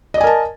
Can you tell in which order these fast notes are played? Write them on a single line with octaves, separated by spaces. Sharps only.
D#5 D5 G#5 A#4 A5